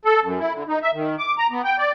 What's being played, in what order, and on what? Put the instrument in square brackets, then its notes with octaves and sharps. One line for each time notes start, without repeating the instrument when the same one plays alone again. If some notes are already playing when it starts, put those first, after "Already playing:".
[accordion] A4
F#2
E4
D3
D#4
E5
D#3
D6
A#5
B3
G5
D5